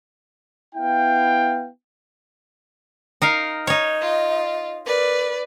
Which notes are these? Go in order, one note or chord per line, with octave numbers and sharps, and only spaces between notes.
B3 E4 F5 G5
D#4 A#4 F5
D#4 C#5 D#5
F4
A#4 B4 D5